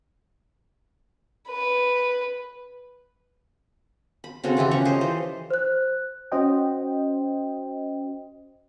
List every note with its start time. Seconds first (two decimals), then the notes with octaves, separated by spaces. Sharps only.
1.49 B4
4.24 B5
4.44 C#3 C4 F#4 A4
4.57 C#3 E3 E4 G4
4.71 F3 C#4 A#5 C#6
4.85 A4 C5 D#5
5.01 E3 C5
5.50 C5 F#6
6.32 C#4 F#4 C5 D#5 G5